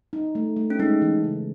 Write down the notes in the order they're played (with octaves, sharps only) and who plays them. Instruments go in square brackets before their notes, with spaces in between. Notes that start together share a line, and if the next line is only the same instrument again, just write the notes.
[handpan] D#4
A3
A3
[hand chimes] C#4
[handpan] G#3 [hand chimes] D#4
[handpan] E3
C#3